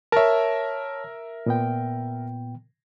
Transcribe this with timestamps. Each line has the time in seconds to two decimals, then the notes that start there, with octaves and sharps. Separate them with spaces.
0.12 A#4 C#5 E5 A5
1.46 A#2 B3 G5